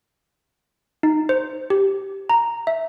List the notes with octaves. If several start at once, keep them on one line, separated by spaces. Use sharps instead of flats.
D#4
C5
G4
A#5
E5